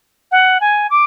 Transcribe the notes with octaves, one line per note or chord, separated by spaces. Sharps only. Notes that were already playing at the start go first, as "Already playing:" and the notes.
F#5
G#5
D6